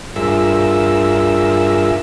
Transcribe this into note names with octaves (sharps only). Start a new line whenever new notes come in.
G2 F4 G#4 A#4 E5 E6